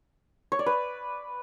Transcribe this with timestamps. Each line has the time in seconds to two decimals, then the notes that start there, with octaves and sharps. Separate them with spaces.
0.52 C#5
0.59 D5
0.66 B4